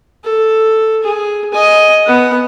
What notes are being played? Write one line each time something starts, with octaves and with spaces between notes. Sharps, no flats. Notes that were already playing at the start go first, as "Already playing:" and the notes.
A4
G#4
D#5 G#5
B3 F#5